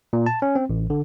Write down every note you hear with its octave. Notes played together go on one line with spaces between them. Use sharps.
A#2
A5
C#4
C4
A1
D3